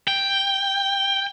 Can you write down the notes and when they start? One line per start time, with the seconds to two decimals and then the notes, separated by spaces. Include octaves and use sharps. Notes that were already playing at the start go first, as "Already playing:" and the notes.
0.08 G5